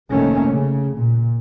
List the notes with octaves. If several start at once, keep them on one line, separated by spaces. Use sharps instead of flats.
F1 D#3 A3 A#3 C#4
C#3
A#2